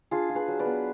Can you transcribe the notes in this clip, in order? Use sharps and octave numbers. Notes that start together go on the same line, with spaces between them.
D4 F4 G#4
F4
G#4 B4
F#3
B4 D5
B3